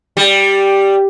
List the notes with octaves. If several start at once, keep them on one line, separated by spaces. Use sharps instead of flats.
G3